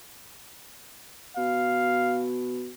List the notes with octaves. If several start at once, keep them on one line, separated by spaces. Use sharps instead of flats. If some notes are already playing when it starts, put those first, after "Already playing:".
B2 F5